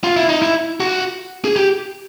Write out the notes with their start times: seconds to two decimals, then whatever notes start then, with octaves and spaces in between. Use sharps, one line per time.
0.04 F4
0.16 E4
0.29 D#4
0.42 E4
0.80 F#4
1.45 G#4
1.56 G4